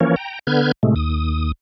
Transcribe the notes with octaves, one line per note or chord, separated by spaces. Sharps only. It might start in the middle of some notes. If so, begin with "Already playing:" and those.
E3 F3 A#3 C#4 A#4 C#5
G5 A#5
D3 B3 B4 F6 G6 G#6
A2 C3 G#3 A3
D#2 D#6